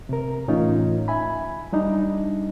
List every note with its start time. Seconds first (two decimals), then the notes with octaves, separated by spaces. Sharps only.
0.09 C3 A#4
0.48 A2 E3 C#4 D#4 F4
1.08 E5 G#5 B5
1.73 G3 D4 D#4